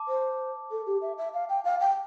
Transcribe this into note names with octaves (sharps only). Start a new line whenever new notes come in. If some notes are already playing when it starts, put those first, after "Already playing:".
Already playing: A5 D6
C5
A4
G4
E5
E5
F5
G5
F5
G5